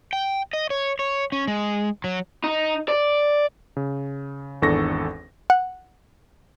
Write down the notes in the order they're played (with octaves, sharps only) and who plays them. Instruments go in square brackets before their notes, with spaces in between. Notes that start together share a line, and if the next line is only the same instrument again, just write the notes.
[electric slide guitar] G5
D#5
C#5
C#5
C#4
G#3
F#3
[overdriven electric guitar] D#4
D5
[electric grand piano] C#3
G#1 E2 D4 A4 C#6 A#6
[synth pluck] F#5